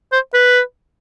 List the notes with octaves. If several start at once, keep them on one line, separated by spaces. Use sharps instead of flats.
C5
B4